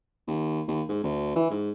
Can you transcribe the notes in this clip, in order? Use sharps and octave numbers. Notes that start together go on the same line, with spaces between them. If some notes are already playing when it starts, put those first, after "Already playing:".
D#2
D#2
G#2
D2
E3
G#2